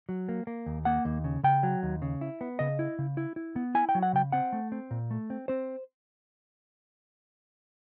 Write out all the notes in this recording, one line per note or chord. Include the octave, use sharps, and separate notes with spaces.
F#3
A#3
A#3
D#2
A#3 F#5
D#2
C#3
C#3 G5
F#3
D#2
C#3
E4
B3
C#3 D#5
E4
C#3
E4
E4
B3
E4 G#5
G5
F#3
F#5
C#3 G5
C4 F#5
A3
C4
A#2
A3
C4
C4 C5